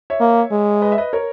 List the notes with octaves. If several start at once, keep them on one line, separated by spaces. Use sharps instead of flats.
C#5 E5
A#3
G#3
B4 D#5
E5
B4 D#5
A#4 C#5